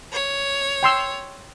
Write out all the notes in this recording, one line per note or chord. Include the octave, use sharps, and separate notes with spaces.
C#5
G5 C6 E6